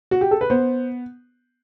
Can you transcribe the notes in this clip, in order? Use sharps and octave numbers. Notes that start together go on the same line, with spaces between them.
F#4
G4
A4
B4
B3 C5